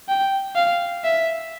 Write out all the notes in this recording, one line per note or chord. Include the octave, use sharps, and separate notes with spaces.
G5
F5
E5